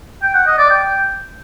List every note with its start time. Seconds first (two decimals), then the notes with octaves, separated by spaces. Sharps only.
0.23 G5
0.35 F#5
0.47 D#5
0.59 D5
0.70 G5